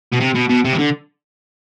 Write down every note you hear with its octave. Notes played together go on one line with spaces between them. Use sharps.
B2
C3
B2
B2
C3
E3
D3